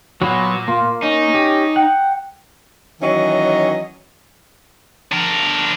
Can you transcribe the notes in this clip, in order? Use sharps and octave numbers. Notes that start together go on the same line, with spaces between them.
A#2 F#3 B3 F#4 C#5
A#3 F4
C#4 D#4
G4
F#5 G5
D#3 E3 F#3 C#4 D#5
D4 A#4